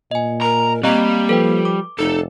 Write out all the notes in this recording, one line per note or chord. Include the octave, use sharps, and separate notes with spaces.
A#2 D#5 G#5
A#4 A#5
G3 A#3 C4 D#5 A#5
F3 A4 B4 G5
D6
F1 D#4 A4